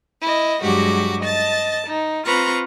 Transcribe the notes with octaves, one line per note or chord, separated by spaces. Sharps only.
E4 D#5
G2 F#3 G#3 F#4 G4 D6
D#5 A5 A6
D#4
C4 F4 B4 A#5 C#6